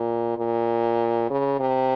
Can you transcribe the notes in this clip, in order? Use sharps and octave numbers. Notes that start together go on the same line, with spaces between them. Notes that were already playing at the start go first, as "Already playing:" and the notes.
Already playing: A#2
A#2
C#3
C3